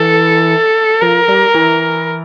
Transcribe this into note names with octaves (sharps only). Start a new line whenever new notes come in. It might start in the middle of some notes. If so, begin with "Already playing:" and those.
Already playing: E3 A4
F3 A#4
G3
E3